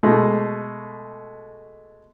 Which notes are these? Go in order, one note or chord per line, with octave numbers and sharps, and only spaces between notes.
B2 G#3 A3